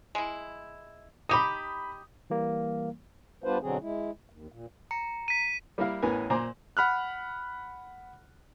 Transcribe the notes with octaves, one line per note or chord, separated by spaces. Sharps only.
G#3 E4
D#4 G4 B5 D#6
E3 G3 A#3
G3 B3 D4 F4 B4 C5
B2 D3 F#3 C4 G#4
G#3 E4
D#2
A#2
A#5 C#7
B6 D#7
G3 A#3 E4 A#4 F5
A1 E3 B3 A#4 G#5
A#2 C5 G#5 A#5 C6 D6
F#5 B5 F6 F#6